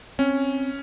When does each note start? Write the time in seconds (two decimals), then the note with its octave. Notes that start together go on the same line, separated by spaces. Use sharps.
0.19 C4 C#4